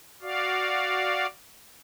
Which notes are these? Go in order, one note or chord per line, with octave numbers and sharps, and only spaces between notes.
F#4 D5 F5